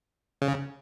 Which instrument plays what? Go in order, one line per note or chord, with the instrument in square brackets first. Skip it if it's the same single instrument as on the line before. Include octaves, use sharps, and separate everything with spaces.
[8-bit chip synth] C#3